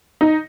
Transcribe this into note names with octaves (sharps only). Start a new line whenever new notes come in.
D#4